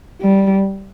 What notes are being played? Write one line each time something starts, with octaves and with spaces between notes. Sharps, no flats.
G3